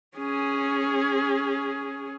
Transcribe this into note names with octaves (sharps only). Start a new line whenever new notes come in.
C#4 G#4